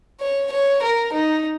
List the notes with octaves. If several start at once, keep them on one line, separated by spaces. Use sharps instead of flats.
C#5
C#5
A#4
D#4